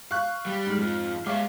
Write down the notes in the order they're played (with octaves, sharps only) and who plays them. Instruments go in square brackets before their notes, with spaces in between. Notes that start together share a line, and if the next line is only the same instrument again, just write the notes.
[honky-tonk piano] F5 C#6 F#6
[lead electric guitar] G3
[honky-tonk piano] G#2 F6
[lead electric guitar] F2 F3
[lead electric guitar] G#3 E5 [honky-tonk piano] C#5 F5 D6